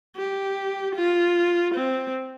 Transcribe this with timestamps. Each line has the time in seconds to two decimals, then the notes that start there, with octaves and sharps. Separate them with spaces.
0.17 G4
0.96 F4
1.75 C4